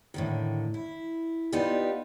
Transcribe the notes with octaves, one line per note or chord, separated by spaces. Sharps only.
A2 D3 D#3
E4
B3 D#4 F4 G4 D5